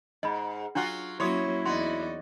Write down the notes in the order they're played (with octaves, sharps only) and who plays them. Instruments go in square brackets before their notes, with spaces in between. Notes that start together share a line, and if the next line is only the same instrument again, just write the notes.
[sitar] G#2 [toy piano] D#5 B5
[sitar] F#3 F4 F#4 [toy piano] D4
[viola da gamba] F#3 A#3 C#4 [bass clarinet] E4 [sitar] C#5 [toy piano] C6 D#6
[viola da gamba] E2 D#4 D5 [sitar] F#4 [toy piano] C6